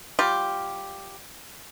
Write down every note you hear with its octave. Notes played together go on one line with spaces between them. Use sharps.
G3 F4 G4